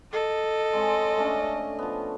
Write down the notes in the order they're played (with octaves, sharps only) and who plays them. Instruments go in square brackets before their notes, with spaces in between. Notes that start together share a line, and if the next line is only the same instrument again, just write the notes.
[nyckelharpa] A4 [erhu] D#5
[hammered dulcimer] G#3 C4 C#5
A3 C#4 D4
F3 B3